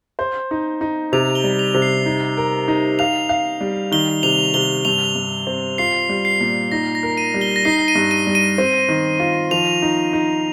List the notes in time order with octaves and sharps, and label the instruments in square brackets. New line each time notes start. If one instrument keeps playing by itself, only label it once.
[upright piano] C5
D#4
D#4
[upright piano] C3 [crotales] F7
[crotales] G7
[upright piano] G3
[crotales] F7
[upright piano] C3
[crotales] C7
[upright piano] D#4
A#4
D#4
[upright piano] F5 [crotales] F7
[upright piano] F5
G3
[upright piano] D#3 [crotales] G7
[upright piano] C3 [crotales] F7
[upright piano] C3 [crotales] G7
[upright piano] G2 [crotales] F7
[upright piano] G2
C4
[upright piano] F4 [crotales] C7
[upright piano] G3
[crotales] C7
[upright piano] A#2
[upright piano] D#4 [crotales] A#6
[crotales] A#6
[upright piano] A#4
[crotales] D#7
[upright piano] G3
[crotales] G7
A#6
[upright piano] D#4 [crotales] C7
[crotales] D#7
[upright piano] G2
[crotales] D#7
[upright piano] G3
[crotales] D#7
[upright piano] C4
D#3
F4
[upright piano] F3 [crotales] F7
[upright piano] D#4
D#4